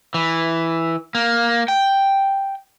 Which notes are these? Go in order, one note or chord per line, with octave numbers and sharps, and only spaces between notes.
E3
A#3
G5